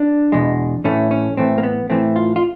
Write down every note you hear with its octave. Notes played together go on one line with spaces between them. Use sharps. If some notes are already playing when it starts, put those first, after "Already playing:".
Already playing: D4
E2 B2 G#3
A2 E3 A3 C#4
C#4
A2 E3 A3 C4
A#3
B3
A2 E3 A3 C4
F4
F4